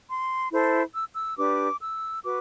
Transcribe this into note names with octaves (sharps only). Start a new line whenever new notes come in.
C6
E4 A4 C5
E6
E6
D4 G4 B4 D6
E6
F#4 B4 D6